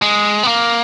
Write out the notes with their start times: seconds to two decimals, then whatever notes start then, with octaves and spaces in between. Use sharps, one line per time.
0.02 G#3
0.43 B3
0.47 A#3